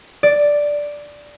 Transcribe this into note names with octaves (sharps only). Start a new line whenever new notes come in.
D5